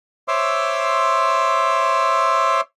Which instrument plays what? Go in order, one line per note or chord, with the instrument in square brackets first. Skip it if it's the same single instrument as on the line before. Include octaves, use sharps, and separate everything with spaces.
[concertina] C5 C#5 E5 C6 D6 E6